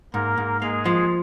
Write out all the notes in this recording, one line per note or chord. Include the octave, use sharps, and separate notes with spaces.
G#2 A#3 A#4
G#2
G#3 A#3 G#4
F3